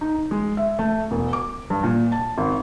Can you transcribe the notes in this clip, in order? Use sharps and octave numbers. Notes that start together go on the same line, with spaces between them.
D#4
G#3
E5
A3
E1
D6
G2
A#2
A5
G#1